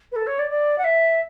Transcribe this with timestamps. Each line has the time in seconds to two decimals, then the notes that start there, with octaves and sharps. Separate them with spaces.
0.12 B4
0.16 A4
0.27 C#5
0.39 D5
0.50 D5
0.78 F#5
0.84 E5